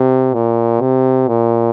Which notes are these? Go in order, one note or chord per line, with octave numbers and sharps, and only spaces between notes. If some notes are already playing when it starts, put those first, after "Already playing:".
Already playing: C3
A#2
C3
A#2